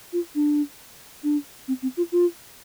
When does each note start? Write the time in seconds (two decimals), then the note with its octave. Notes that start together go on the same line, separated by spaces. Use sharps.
0.13 F4
0.35 D4
1.24 D4
1.68 C4
1.82 C4
1.97 F4
2.12 F4